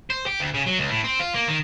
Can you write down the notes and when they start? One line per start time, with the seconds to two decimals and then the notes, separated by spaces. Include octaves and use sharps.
0.10 C5
0.26 G4
0.40 D2
0.54 C#3
0.66 F#3
0.79 C#2
0.90 A2
1.04 C4
1.20 F4
1.35 A#3
1.48 D#3